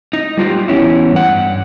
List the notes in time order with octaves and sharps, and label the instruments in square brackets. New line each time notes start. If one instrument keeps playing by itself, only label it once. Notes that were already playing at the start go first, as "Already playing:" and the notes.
[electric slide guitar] D#4
G3 F4 G4
E3 B3 C#4 E4
G2 F#5